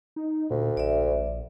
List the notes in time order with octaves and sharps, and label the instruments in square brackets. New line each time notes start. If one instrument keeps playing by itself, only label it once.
[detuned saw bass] D#4
[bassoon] D2 [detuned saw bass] A#2
[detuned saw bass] A#1 [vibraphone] D5 E5